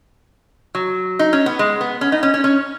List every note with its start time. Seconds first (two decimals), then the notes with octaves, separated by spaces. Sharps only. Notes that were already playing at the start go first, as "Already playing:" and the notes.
0.75 F#3
1.19 D#4
1.33 C#4
1.46 B3
1.59 G#3
1.81 B3
2.01 C#4
2.12 D#4
2.23 C#4
2.34 C#4
2.44 C#4